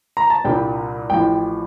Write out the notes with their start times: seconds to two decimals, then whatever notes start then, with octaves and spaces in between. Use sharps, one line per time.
0.17 A#5
0.30 A5
0.44 C2 A#2 G3 D4 G5
1.10 A1 A2 F3 G5